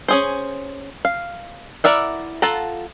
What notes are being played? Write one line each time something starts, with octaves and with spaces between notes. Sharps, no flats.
C#4 G#4 C5
F5
E4 A#4 D5 E5 F#5
F4 A4 F#5 A5 A#5